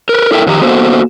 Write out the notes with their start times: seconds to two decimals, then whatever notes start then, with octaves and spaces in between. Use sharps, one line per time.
0.09 A#4 B4
0.31 E4 A4 A#4 E5 F5 G5
0.47 F2 D#3 G4 A#5
0.62 A#3 B3 F#4 A4 C5